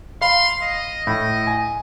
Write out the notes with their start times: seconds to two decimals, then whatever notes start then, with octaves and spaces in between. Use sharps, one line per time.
0.21 F5 B5 C6
0.63 D#5
1.07 A2
1.47 G#5